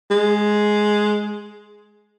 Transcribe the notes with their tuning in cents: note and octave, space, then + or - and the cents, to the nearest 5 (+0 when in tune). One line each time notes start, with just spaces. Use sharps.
G#3 +5